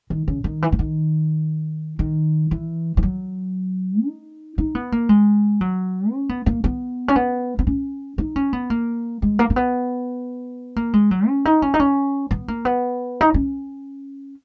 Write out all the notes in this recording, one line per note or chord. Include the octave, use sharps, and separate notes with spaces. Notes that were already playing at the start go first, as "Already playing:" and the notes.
D#3
C#3
D#3
E3
E3
D#3
D#3
E3
E3
F#3
D#4
D#4
B3
A#3
G#3
F#3
C#4
B3
A#3
B3
C#4
B3
B3
C#4
D#4
C#4
B3
A#3
G#3
A#3
A#3
B3
A#3
G#3
F#3
C#4
D#4
C#4
D#4
C#4
B3
A#3
B3
D#4
C#4